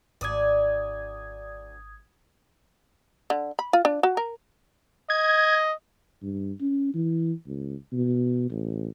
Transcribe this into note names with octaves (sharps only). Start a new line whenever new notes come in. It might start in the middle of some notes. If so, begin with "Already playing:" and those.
G#1 D2 D5 D#6 G#6
D3
B5
F4
D4
F#4
A#4
D#5 G#6
G2
C#4
E3
C#2
B2
A1